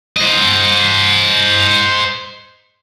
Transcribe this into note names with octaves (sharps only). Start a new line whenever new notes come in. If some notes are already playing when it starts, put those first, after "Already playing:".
C5 D#5